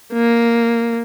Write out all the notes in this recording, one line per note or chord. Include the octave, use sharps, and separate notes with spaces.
A#3